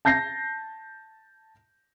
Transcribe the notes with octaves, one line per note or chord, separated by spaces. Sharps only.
A5 G6 A#6 C7